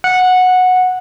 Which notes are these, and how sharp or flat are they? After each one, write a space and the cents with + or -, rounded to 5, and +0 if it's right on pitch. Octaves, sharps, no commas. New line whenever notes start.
F#5 -10